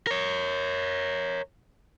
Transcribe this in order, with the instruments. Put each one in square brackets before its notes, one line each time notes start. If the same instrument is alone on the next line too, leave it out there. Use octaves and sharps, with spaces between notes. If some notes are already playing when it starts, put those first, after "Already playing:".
[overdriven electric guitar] A#4 C#5